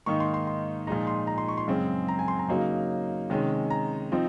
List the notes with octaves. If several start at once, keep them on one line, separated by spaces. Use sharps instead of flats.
G#2 D#3 A#3 D#4 C#6
C6
C6
C6
A#2 F3 G#3 D#4 A#5
C6
A#5
C6
C#6
C6
F#2 C#3 G#3 C4
A#5
G#5
C6
A#5
C#3 F#3 A#3 D#4
C3 D#3 G#3 C#4
A#5
F3 C4 D#4